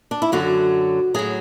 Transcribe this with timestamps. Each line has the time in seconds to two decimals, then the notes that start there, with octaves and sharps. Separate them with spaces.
0.11 D4
0.22 E4
0.32 F#2 D3 F#3 F#4
1.14 A2 F#3 G#4